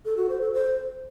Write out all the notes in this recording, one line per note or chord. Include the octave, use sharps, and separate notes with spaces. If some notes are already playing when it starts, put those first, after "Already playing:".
A4
F#4
C5
A4
C5